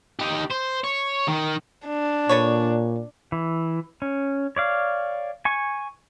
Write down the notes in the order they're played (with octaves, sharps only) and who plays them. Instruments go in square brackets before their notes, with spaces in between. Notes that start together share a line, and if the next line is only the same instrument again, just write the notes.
[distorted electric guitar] D#4 G4
C5
C#5
D#3
[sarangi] D4
[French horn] A#2 [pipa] A4 B4 C#5
[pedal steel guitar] E3
C#4
C#5 D5 F5
G#5 C#6